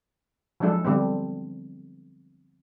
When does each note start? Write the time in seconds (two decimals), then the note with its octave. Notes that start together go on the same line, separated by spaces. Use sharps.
0.60 F3 F#3 G#3 D4 E4 A4
0.85 D3 G3 B3 C4